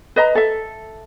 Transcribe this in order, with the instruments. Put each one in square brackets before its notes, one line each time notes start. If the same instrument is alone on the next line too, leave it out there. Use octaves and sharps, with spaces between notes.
[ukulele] B4 D#5 A#5
A4 E5